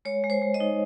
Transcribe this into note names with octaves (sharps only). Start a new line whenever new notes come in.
G#3 C#5
G#3
C5
G#3
D#5
D#4